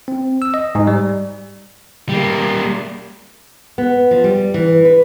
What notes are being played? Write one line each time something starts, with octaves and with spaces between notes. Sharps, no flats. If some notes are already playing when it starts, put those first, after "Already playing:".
C4
E6
D#5
G#2
G3
G3 A#3
B3
F3
G3
E3
B4